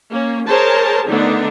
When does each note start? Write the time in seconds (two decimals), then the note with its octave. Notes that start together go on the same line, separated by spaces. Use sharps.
0.11 A#3 C#4
0.47 G#4 A#4 C5 C#5 A5
1.07 D3 D#3 A3 B3 D4 D#4